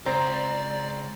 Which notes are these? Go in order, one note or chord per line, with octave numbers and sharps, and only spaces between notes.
C#2 C4 D5 A#5